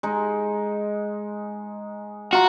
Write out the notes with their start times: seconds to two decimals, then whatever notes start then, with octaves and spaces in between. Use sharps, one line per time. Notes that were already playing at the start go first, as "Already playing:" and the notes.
0.03 G#3 D#4
2.33 F4 F#4 A#5